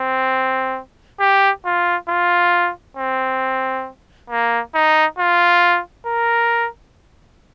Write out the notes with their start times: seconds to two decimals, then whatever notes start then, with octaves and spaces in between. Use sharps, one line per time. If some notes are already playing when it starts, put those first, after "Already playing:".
Already playing: C4
1.20 G4
1.65 F4
2.09 F4
2.97 C4
4.30 A#3
4.75 D#4
5.19 F4
6.06 A#4